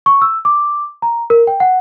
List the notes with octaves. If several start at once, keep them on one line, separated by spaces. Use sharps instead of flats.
C#6
E6
D6
A#5
A#4
G5
F#5